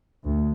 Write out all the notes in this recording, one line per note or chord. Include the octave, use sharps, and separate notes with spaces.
D2